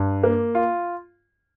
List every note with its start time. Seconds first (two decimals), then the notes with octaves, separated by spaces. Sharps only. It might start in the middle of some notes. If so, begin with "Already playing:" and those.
Already playing: G2
0.23 A#3
0.55 F4